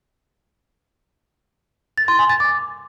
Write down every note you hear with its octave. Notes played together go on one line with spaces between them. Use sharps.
A6
C6
G#5
A6
D6